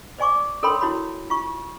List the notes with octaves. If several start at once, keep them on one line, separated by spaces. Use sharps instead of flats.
C5 D5 G#5 C#6 D6
A4 A#4 C#5 G5 B5 C6
E4 F#4 C#5 B5
F4 C#6